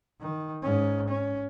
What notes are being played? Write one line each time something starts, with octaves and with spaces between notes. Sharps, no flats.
D#3
G#2 C#4
C#4